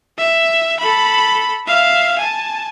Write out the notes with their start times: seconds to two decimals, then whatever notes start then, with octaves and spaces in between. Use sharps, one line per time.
0.18 E5
0.80 A4 B5
1.67 E5 F5
2.18 G#5 A5